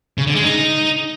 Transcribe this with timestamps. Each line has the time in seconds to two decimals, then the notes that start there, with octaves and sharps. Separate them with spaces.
0.18 C#3
0.27 D3
0.35 G#3
0.44 D#4